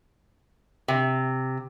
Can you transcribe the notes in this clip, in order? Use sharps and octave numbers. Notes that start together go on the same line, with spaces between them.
C3